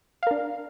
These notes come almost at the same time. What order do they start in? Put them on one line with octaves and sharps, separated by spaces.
F5 A#4 D4